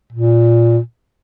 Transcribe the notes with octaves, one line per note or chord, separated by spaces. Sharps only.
A#2